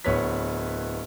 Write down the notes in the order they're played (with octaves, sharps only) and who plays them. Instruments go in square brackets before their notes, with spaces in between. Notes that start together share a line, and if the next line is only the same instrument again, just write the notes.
[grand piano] D1 B3 B4 C#5 B6